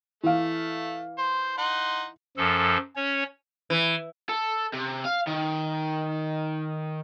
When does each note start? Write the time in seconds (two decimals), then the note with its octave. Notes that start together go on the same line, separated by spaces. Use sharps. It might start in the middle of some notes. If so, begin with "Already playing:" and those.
0.23 E3 A3 F5
1.18 C5
1.58 D#4 F#5 C6
2.37 F#2 F3 A4
2.96 C#4 C#5
3.70 E3
4.29 A4
4.73 C3
5.05 F5
5.27 D#3